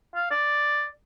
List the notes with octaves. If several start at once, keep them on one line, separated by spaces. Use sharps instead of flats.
F5
D5